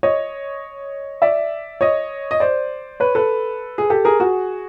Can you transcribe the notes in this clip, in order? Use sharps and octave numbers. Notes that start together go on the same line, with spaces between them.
C#5 D#5
D5 E5
C#5 D#5
D#5
C5 D5
B4 C#5
A4 B4
G#4
G4 A4
G#4 A#4
F#4 G#4